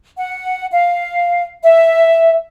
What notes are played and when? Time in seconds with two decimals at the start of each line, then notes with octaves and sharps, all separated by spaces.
0.17 F#5
0.73 F5
1.63 E5